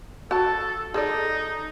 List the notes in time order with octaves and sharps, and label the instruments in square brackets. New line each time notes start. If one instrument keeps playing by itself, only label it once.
[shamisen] F#4 A5 [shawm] A4
[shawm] D#4 [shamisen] G#4 A4 D5